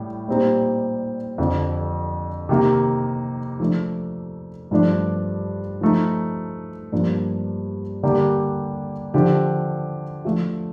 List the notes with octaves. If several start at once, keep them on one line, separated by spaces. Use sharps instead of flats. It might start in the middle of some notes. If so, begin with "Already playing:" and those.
Already playing: A2 G3
A#2 G3 C4 D#4
F2 D3 F3
C3 D#3 A#3
F3 A3 D4
G2 F3 A3 D4
F3 A3 D#4
G2 F3 A#3 D4
D3 G3 A#3 D4 G4
D3 F3 C4 G4
F3 A3 D4 F4